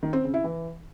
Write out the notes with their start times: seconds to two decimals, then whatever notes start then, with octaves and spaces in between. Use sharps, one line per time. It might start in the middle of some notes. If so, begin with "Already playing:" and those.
0.03 D#3
0.13 C4
0.23 C#3
0.34 E4
0.44 E3